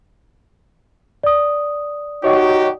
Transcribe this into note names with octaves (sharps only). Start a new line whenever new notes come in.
D5 D#6
D#4 F#4 G4 C#5 D#5 C#6